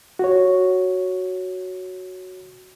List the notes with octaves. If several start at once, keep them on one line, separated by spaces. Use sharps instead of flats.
F#4 C#5